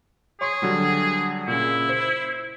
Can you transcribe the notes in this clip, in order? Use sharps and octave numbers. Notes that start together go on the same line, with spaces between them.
G#4 C#5 C6 C#6
D3 F#3 G3
A#2 C#3 E4
C5